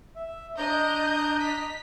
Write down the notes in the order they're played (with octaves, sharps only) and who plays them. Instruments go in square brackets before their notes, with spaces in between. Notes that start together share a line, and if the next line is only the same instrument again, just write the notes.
[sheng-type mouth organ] E5
[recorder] D4 [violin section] D#5 [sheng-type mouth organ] A#5 [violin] G6
[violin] B6